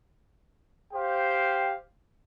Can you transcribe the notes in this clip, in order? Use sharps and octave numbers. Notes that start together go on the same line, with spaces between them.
G4 C5 F5 G5